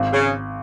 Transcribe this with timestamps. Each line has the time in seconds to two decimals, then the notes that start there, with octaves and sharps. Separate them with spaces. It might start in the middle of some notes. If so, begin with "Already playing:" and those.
Already playing: G#1
0.13 C#3